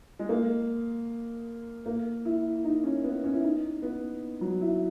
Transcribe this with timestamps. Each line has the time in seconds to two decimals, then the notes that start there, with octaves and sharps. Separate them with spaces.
0.19 G#3
0.29 A#3
1.86 A#3
2.25 E4
2.65 D#4
2.84 C#4
3.04 B3
3.24 C#4
3.35 E4
3.43 D#4
3.82 B3
4.41 F#3
4.61 E4